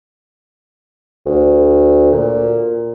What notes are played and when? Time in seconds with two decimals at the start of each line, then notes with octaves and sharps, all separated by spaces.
1.26 D2
2.12 A#2